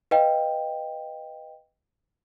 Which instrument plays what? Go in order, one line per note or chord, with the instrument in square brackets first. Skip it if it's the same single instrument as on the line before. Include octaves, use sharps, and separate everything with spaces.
[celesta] B4 D#5 F5 G5